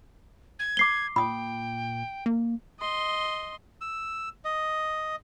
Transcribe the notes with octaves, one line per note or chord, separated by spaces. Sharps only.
G#6
D6 C7 G7
A#2 G5 B5 D#6
A#3
D#5 C6
E6
D#5